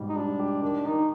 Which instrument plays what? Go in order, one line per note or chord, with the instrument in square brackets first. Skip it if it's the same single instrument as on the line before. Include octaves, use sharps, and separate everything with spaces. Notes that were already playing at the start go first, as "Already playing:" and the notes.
Already playing: [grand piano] G#2 B2 G3
[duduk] D#4
[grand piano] G3 [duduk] D4
[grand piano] G4
[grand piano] D#3 [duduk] D4
[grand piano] D#3 [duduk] D#4